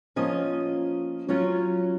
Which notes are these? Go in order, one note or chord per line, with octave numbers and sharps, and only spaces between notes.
F3 A#3 C#4 F4 D#5
F#3 C#4 F4 C#5